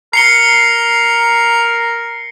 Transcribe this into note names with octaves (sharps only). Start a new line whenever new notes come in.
A#4 A#5 C7 C#7 G7